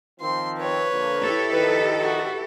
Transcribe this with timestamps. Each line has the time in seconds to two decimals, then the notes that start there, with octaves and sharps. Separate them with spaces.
0.21 D#3 F3 C4 C6
0.58 B4 C#5
0.92 D3 F3 A#3
1.23 E4 G4 A4
1.52 D#3 F3 B4 D#5
2.02 F#4